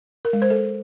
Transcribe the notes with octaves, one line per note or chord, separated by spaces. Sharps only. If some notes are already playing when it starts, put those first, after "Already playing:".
A#4
G#3
C5
A4